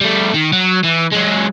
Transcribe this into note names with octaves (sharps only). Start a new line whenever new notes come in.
G3 A3
D#3
F#3
E3
F#3 G#3